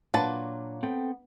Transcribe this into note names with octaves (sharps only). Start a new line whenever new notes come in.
A#2 F#3 D4 F4 B4 A5
B3 C4 A4 G5